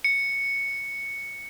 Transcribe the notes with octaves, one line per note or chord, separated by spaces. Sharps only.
C#7